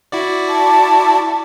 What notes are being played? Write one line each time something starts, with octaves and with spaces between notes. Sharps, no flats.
E4 F#4 D5
A5